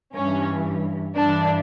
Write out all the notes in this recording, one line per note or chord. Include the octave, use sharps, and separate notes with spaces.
G2 E3 C#4
G2 E3 D4